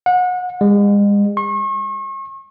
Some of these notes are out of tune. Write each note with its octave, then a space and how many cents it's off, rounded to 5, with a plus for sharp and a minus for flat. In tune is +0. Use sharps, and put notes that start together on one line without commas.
F#5 -30
G#3 -40
C#6 -40